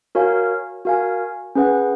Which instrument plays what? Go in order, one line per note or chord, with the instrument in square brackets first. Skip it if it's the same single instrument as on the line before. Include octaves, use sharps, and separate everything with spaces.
[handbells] F#4 A#4 C#5 F5 G#5
F#4 A#4 F5 G#5
C#4 G#4 B4 F#5